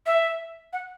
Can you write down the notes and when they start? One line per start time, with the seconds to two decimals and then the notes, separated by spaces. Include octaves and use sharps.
0.06 E5
0.73 F#5